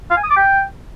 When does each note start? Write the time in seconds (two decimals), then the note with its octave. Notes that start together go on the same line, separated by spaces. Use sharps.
0.11 F5
0.17 G#5
0.24 D#6
0.30 D6
0.37 G5